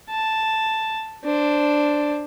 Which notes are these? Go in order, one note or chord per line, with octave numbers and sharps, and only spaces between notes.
A5
D4 C5